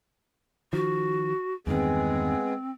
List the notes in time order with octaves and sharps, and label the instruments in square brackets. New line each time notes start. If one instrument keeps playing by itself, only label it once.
[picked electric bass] D#3 F3 [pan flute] F#4
[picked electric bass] E2 G2 D#3 [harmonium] G#3 B3 G#4 [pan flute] C4